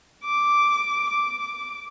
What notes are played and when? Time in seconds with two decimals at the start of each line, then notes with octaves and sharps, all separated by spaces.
0.24 D6
1.10 D6